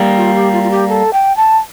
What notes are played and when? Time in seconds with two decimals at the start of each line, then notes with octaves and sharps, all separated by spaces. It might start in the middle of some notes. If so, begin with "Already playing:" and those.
Already playing: G3 A#3
0.17 F4
0.35 G4
0.53 F4
0.63 F4
0.71 G4
0.89 A4
1.13 G5
1.37 A5